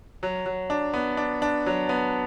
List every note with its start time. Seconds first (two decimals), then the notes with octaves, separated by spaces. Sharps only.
0.23 F#3
0.46 F#3
0.70 D4
0.94 B3
1.17 D4
1.42 D4
1.66 F#3
1.89 B3